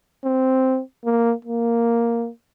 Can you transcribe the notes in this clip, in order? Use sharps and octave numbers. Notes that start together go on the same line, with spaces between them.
C4
A#3
A#3